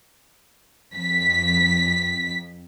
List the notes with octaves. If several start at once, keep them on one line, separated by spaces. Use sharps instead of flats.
F2 B6